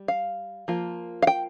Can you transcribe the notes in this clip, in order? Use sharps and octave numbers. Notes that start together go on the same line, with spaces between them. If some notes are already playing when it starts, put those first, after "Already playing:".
Already playing: G3
F5
F3 A#3 F4
F5
G5